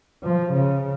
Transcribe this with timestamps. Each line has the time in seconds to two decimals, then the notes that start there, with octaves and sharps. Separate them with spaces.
0.24 F3
0.52 C#3